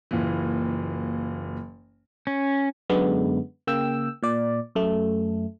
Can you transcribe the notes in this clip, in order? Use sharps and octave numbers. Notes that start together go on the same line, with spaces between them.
F#1 A#2 E3
C#4
F#2 D3 G#3 B3
C#3 A#3 G5 E6
A#2 D5
F#2 A3